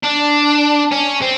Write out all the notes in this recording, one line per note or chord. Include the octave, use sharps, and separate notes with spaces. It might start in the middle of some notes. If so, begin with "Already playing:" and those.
D4
C#4
C4